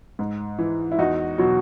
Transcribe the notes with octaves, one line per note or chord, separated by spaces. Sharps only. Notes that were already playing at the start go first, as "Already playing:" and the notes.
G#2
E3
E4
E2 D#4 F#4
B2 F#3